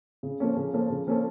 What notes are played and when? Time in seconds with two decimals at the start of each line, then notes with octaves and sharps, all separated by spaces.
0.23 C#3
0.40 F3 A#3 C#4 A4
0.56 C#3
0.73 F3 A#3 C#4 A4
0.90 C#3
1.07 F3 A#3 C#4 A4